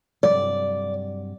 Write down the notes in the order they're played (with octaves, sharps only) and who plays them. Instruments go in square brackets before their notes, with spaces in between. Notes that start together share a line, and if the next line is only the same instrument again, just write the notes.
[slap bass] G2 C3 F#3 [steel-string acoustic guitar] D5